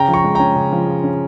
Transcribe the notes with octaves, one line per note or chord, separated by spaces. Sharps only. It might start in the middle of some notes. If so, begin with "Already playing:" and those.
Already playing: C#3 C#4 G5 A#5
F3
A#5 C#6
G#3
C#4 G5 A#5
C#3
F3
G#3
C#4